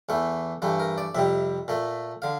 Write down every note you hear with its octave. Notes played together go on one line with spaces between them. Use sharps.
E2 E3 A3
G2 E3 A3
A#4
D5
F2 C3 G3 E5
A#2 A3
D3 F5